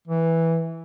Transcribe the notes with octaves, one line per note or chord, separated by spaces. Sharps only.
E3